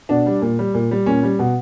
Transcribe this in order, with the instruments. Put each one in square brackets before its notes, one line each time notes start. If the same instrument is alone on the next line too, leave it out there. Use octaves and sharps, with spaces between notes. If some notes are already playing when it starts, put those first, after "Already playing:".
[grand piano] B2 D4
G3
A#2
G3
A#2
G3
A#2 C#4
G3
B2